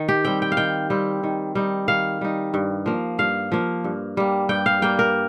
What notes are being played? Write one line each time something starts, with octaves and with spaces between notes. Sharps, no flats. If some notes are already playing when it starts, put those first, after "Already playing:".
Already playing: D#3
G4
G3 C4 G5
G5
F5
D#3 G5
G3 C4
D#3
G3 D#4
D#3 F5
G3 D#4
G2
F3 A#3
G2 F5
F3 A#3
G2
G3 A#3
G2 G5
F5
G3 A#3 G5
A#4